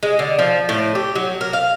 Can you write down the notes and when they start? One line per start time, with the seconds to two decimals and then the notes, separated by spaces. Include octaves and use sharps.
0.03 G#3
0.19 D3
0.39 F3
0.69 A2
0.95 G4
1.16 F#3
1.41 A#4
1.53 F5